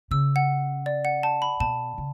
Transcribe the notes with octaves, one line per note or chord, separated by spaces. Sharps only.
C#3 E6
F#5
D5
F#5
A5
B5
B2 A5
C#3